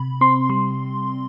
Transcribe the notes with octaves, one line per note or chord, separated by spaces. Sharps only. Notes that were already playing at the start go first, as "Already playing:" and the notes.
Already playing: C3 B5
C4 C6
G3 C6